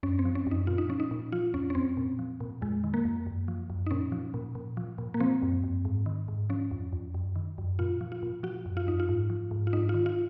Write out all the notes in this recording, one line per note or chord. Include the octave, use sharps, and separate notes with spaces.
F#2 C#4
C4
F3
C#4
F#2 D#4
A#2 F4
D#4
F3 C#4
D#4
A#2
F3 F4
F2 C#4
C#4
F2 C4
A#2
F3
A#2
F2 G#3
D#3
A#3
F2
F#2
F3
F#2
D#4
A#2 C#4
F3
A#2
A#2
F3
A#2
A#3
F3 C4
F#2
F#2
G#2
D#3
G#2
F3 C#4
F2
F2
F#2
D#3
F#2
A#2 F4
F3
F4
A#2
F3 F#4
F#2
F4
F#2 D#4
F4
G#2
F3
G#2
F4
G#2 D#4
D#3 F4
F4